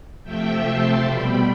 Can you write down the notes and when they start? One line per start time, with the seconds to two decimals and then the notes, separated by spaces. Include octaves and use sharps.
0.23 C3 F3 A3 E5 G5
0.63 A5 C6
1.04 B2 G3 G5 B5